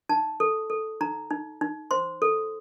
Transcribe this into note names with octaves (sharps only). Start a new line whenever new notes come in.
D#4 A5
A4
A4
D#4 A#5
D#4
D#4
C5 C6
A4